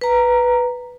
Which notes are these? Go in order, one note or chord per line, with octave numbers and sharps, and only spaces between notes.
B4 A#5